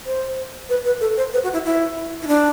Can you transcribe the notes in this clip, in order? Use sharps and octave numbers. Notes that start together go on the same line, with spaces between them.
C5
B4
B4
A4
C5
B4
F#4
E4
E4
E4
D4